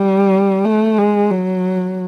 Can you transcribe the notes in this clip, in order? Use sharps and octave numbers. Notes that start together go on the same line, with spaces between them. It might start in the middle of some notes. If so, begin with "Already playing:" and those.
Already playing: G3
A3
G#3
F#3